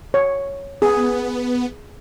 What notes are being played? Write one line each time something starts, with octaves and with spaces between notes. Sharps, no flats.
C#5
B3 G#4